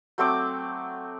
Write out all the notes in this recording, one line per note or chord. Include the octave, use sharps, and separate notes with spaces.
F#3 A3 C4 D6